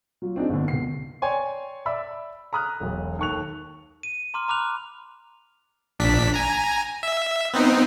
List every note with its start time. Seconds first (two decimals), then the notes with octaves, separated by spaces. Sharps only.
0.22 F#3 F4
0.36 C4 D4 D#4 G#4
0.49 G1 D3
0.68 C#2 B2 C7
1.22 C#5 D5 G5 G#5 C6 C#6
1.86 D5 E5 B5 E6
2.53 A#5 B5 D#6 F6 F#6
2.80 E1 B1
3.19 D#2 A4 C#6 F#6 F7
4.03 D#7
4.34 A#5 C6 D6 F6
4.48 A#5 B5 D6 F6 F#6 F7
5.99 A#1 D4 B6
6.34 G#5 A#5
7.03 E5
7.54 B3 C4 D#4